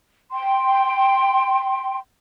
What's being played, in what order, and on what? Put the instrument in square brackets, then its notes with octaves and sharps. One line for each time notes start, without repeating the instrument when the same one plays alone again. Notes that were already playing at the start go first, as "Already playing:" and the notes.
[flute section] G5 C6